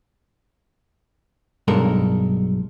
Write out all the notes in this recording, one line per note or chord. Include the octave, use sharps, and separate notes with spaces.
B1 G2 G#3 A4 A#4